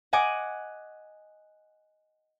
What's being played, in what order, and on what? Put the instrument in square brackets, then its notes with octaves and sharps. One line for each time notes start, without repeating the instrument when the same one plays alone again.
[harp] D#5 F#5 G#5 D6